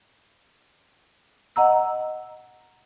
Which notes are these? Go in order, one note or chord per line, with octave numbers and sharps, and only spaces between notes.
D#5 F#5 A#5 E6